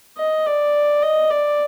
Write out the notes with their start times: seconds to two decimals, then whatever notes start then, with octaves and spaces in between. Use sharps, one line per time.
0.18 D#5
0.47 D5
1.03 D#5
1.31 D5